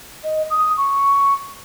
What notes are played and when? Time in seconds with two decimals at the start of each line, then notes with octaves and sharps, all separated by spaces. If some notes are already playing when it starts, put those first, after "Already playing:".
0.24 D#5
0.50 D#6
0.77 C#6